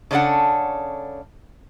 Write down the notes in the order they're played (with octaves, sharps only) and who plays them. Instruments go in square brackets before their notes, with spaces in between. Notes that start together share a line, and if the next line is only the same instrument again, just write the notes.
[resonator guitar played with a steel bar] C#3 C#4 D4 A4 F#5